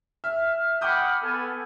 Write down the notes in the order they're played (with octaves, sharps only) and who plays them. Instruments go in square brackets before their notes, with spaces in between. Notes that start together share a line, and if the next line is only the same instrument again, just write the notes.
[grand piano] E5 [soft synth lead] F6
[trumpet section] F#5 G5 B5 [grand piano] D6 D#6 G6
[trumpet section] B3 A4 G#5